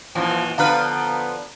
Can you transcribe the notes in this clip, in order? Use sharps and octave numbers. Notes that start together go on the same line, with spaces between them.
F#2 A#2 E3 F3
D3 F3 B3 B4 F5 A#5 F6